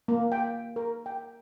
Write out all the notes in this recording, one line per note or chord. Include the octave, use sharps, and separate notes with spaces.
A#3
G5
A#4
G5